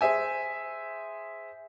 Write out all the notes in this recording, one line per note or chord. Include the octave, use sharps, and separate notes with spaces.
G#4 C5 E5 G#5